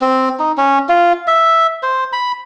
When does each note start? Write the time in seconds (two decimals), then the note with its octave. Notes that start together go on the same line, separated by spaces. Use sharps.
0.01 C4
0.39 D#4
0.58 C#4
0.89 F4
1.27 E5
1.83 C5
2.13 B5